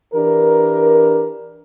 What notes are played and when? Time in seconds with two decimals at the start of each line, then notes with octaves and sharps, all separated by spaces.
0.14 E3 D4 G4 A#4